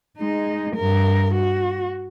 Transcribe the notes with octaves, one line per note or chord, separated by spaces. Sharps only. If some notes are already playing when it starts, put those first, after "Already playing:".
G#3 D#4
G2 A#4
F#4